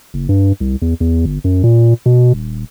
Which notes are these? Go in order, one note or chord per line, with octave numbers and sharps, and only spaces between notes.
F#1
G2
C2
E2
E2
G1
F#2
A#2
B2
D#1